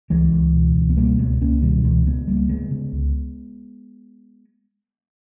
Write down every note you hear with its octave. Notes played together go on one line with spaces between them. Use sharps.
C#2 E3 G#3
C#2
B2
C#2
B3
B2 G3 A#3
C#2 G#3 B3
C#2 A#3 C#4
B2 D#3 G3
C#2 E3 G#3
C#3 G#3 B3
C#2 G3 A#3
C#3 G#3 B3
C#3
C#2